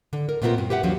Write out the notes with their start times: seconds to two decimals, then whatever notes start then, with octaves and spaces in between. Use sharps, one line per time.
0.13 D3
0.29 A#4
0.42 A#2 A3 B3 C4 F4 A#4
0.58 G2
0.70 G4 B4 E5 F#5
0.83 D#2 F3 F#3 C#4